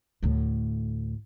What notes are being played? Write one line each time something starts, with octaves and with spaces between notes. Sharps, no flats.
D2 A2